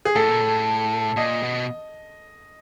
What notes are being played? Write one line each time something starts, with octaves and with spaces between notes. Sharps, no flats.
G#4
A2 A4
A#2
A2
A#2 D#5
B2